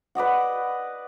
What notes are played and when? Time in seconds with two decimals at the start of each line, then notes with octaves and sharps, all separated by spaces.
0.15 B4 D5 D#5 F#5